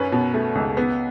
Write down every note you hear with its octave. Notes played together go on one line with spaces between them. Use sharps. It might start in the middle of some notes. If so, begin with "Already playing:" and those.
Already playing: F#2 C#4 B4
B2
A3
C#2
B3